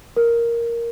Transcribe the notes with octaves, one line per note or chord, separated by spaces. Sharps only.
A#4